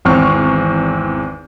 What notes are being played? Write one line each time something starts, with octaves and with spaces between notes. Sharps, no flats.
G#1 E2 C4 C#6 F6